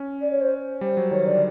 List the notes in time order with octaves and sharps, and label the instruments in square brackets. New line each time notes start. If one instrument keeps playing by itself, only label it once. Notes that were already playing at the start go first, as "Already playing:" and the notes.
Already playing: [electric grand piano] C#4
[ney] D5
C#5
C5
[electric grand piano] G3 [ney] C5
[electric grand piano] F#3
[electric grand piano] D#3 [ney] C#5
[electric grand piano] D3 [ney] D5